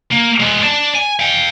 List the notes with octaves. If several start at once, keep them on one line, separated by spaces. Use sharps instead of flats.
A#3
G#3 B3
D5 A5
G#5
F5 G5